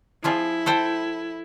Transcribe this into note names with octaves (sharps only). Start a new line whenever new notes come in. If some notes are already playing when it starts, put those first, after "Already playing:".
F3 E4 F4 G#4
A4 C5 G5